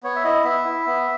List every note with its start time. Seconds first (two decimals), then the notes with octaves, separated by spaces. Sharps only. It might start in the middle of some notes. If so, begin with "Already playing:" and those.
0.03 B3 C#5
0.16 E5
0.24 E4 D#5
0.44 B3 E5
0.65 E4
0.86 B3